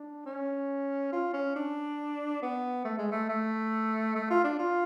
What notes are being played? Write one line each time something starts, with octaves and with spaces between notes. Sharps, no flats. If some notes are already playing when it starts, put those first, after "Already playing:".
Already playing: D4
C#4
F4
C#4
D4
B3
A3
G#3
A3
A3
A3
F4
D4
F4